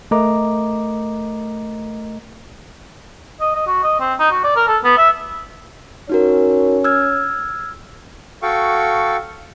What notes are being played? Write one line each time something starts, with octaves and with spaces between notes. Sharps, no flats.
A3 A#4 D#5 A#5 D6
D#5
D#5
F#4
D#5
C4
D#4
F#4
D5
A#4
A4
B3
E5
C#4 D#4 F#4 A#4 C#5
E6 F6 G#6
F#4 A4 F5 G5 C#6